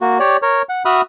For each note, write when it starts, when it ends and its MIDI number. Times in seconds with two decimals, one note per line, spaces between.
0.01 0.18 58
0.01 0.18 66
0.20 0.37 67
0.20 0.37 73
0.20 0.37 74
0.42 0.62 70
0.42 0.62 73
0.69 0.83 78
0.85 1.01 66
0.85 1.01 76
0.85 1.01 83
0.85 1.01 87
0.85 1.01 89
0.85 1.01 90